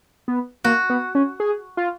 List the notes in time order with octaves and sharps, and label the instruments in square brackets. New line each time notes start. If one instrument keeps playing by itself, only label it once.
[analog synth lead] B3
[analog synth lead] A#3 [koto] F#4
[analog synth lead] B3
C#4
G#4
F4